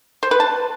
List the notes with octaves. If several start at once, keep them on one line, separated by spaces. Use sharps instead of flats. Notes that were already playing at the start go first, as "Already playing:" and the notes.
C5
B4
A5